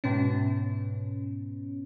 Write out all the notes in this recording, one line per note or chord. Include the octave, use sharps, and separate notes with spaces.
G#2 B2 B3 C#4